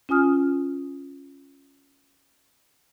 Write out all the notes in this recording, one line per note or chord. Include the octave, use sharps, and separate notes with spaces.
C#4 F4 G#5 D#6 F6